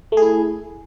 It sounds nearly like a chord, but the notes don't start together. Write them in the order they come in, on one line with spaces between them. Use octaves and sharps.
A3 G#4 E4